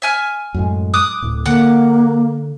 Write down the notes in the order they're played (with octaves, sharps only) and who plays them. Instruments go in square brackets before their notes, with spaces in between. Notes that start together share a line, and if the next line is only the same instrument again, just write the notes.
[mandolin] E5 G#5 F6
[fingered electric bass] F#2 A2 G#3
[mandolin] D6 D#6 F#6
[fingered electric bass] D1 A2
[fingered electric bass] D3 [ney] A#3 [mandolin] F#5 D6 F#6